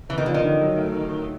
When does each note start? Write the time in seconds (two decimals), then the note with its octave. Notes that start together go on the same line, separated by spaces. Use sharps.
0.09 E3 B3
0.18 D#3
0.26 D3 F3
0.34 D#3
0.43 D3
0.61 F#3
0.78 A3